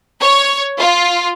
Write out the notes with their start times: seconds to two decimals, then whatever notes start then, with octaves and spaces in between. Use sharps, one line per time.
0.21 C#5
0.78 F4